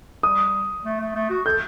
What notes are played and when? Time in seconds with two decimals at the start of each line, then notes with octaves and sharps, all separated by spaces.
0.23 G3 D#6
0.85 A3
1.00 A3
1.15 A3
1.30 F#4
1.46 A4 G6